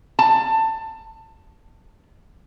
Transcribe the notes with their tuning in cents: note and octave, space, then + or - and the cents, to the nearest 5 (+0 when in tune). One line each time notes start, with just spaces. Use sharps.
A5 +20